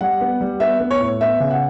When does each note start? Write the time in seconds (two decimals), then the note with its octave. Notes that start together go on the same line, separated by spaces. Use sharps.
0.01 G3 F#5
0.21 B3
0.41 G3
0.60 B3 E5
0.80 B3
0.91 C#5
1.00 A2
1.21 B3 E5
1.40 C#3
1.51 F#5